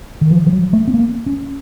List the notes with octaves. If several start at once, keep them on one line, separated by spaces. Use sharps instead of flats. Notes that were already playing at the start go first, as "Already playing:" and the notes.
D#3
F3
F3
F#3
A3
C4
A#3
C#4